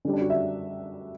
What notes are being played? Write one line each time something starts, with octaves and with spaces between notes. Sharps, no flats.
D3 G3 C#4
D4
F#4
E5